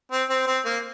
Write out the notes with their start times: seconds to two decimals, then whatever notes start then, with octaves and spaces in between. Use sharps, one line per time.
0.12 C4
0.29 C4
0.47 C4
0.65 A#3